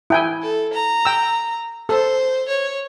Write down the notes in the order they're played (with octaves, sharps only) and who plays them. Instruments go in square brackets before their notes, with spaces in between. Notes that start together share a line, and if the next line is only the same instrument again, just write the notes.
[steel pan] E4 G5 G#5
[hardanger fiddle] A4
A#5
[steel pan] G5 E6
[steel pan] A4 [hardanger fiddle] C5
[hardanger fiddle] C#5